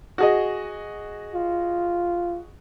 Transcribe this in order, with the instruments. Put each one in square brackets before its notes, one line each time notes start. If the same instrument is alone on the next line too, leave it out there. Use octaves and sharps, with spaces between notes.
[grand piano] F#4 G#4 D#5
[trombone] F4